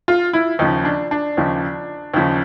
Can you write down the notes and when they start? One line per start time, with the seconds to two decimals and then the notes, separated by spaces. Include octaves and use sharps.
0.08 F4
0.33 E4
0.59 D#2 C#3 F3 D#4
0.85 D4
1.11 D4
1.37 D#2 C#3 F3
2.14 D#2 C#3 F3